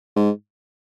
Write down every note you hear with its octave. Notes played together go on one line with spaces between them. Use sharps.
G#2